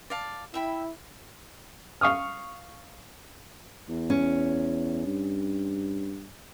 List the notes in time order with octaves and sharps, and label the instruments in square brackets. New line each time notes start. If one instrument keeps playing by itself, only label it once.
[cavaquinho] D5 F5 A5
[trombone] E4 [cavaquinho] E5 G5 B5
[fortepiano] F5 C#6 D#6 F6
[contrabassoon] E2
[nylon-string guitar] C#4
[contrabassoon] G2